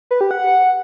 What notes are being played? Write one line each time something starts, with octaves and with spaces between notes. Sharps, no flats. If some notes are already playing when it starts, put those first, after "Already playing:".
B4
G4
F#5